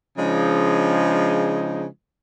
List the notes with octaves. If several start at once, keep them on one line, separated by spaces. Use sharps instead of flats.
C#3 F3 G#3 D4 D#4